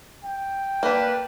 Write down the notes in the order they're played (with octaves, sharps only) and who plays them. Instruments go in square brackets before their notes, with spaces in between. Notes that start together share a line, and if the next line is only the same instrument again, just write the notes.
[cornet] G5
[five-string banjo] A#3 D4 [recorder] B4